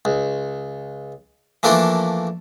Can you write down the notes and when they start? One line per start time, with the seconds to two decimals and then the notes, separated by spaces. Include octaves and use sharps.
0.05 C#2
1.63 E3 F3 A3 A#3 D4 E4